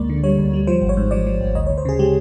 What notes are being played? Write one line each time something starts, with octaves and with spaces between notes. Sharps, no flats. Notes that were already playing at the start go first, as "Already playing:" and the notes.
Already playing: D2 G#3 A#3 D5
D3
G3 C#5
D2
G3
F3 C5
G#1
C#5
G#2
F3 D5
F3
G#1
D2 D#5
C#5
D2
C5
C#3 G#4
G#3 G4